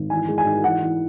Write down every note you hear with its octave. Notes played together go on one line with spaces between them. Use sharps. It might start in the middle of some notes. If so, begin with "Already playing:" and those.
Already playing: G#1
E3 G#5
G#3
G#5
G#2
E3 F#5
E3